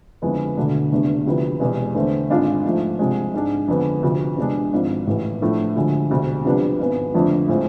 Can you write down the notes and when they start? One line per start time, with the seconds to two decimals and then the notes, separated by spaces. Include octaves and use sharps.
0.22 F2 D3 G#3 B3 E4
0.56 E1 D2 D3 A3 D4
0.92 F1 E2 D3 A3 D4
1.26 D2 C3 F3 B3 E4
1.60 E1 E2 C3 G#3
1.95 E2 D3 A3 C4
2.30 G#1 G#2 G#3 D4 F4
2.65 G#2 F3 A3
2.99 C2 C3 F3 G#3
3.34 G#2 G#3 D4
3.68 F2 D3 G#3 B3
4.03 D2 C3 F3
4.37 E2 C3 G#3 D4
4.72 G#1 G#2 F3
5.07 A1 A2 E3
5.41 A2 F3 A3 D4 F4
5.76 D2 D3 F3 G#3
6.10 E1 D2 C3 G#3 C4
6.45 C2 C3 F3 B3 D4
6.79 G#1 G#2 G#3 B3
7.14 F2 D3 F3 A3 D4
7.48 A2 G#3 C4 F4